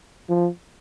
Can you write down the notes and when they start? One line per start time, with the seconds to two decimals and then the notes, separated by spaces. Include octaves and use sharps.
0.29 F3